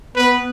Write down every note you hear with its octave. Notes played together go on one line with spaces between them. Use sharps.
B3 B4